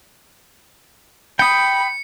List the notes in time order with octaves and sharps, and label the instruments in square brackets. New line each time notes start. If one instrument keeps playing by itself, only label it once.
[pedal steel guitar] G5 D#6 [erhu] B5 [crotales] C#7